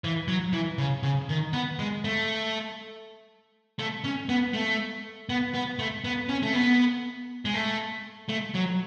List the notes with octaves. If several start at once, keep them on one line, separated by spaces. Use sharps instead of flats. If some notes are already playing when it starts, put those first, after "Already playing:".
E3
F#3
E3
C#3
C#3
D#3
B3
G#3
A3
A3
C#4
B3
A3
B3
B3
A3
B3
C#4
A3
B3
G#3
A3
A3
F#3